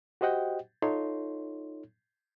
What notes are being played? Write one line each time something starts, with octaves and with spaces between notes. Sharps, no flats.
F#4 G4 C5 D#5 F#5 G5
D#4 F4 A4 C#5 C6